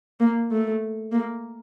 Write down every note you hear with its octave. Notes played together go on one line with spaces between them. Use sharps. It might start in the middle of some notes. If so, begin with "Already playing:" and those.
A#3
A3
A#3